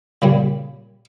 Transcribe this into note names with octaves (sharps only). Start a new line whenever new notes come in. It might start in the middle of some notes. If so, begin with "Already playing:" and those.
A#2 C#3 G3